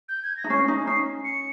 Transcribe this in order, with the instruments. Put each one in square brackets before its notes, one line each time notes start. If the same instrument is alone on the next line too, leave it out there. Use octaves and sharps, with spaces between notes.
[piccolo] G6
G#6
A#6
[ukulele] D#4
[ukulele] C#4 [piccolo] C7
[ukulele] D#4
[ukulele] C#4 [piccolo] C7
[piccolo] C#7